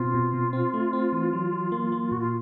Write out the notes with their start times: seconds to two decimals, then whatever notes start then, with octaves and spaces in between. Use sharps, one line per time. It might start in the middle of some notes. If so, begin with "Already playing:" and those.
Already playing: B2 C4 F4
0.14 B2
0.33 B2
0.53 C4
0.74 A3
0.93 C4
1.13 E3
1.33 F#3
1.52 F#3
1.72 A#3
1.92 A#3
2.11 A#2 F#4
2.19 F4